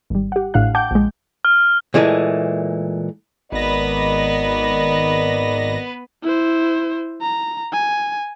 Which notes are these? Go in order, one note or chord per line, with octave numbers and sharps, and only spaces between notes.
G#1 G3
G4 F#5
A1 A2 D4 F5 F#5 F#6
F#5 G5 A5 D6 G6
A#1 G#3
F6
A#2 E3 G#3 A3
G#1 B3 A#4 B4 D5 D#5 A#6
E4 C5
A#5
G#5